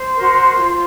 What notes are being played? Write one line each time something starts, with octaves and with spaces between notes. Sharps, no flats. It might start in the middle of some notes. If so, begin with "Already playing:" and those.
Already playing: C5 C6
F#4 A#4
F4